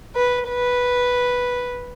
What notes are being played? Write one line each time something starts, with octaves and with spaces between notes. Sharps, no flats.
B4
B4